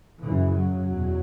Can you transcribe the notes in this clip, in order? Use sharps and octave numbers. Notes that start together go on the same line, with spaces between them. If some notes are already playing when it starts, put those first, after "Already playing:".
F#2 C#3 E3
F#3
E2 B2